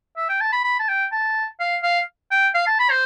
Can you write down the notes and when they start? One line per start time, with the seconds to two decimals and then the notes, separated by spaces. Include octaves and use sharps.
0.17 E5
0.29 G5
0.41 A5
0.53 B5
0.64 B5
0.79 A5
0.88 G5
1.12 A5
1.60 F5
1.83 F5
2.31 G5
2.55 F5
2.67 A5
2.79 B5
2.90 C5